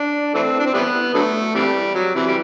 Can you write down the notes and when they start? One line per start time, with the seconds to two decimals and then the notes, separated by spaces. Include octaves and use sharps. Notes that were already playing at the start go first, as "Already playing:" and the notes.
Already playing: D4
0.34 E3 A3 C4
0.59 D4
0.66 C4
0.74 E3 G3 B3
1.14 D3 F#3 A3
1.55 C3 E3 G3
1.95 F#3
2.15 C3 E3
2.27 G3